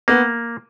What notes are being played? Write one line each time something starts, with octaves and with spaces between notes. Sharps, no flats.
A#3 B3